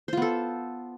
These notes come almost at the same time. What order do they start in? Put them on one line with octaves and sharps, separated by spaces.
C5 F4 B3 A4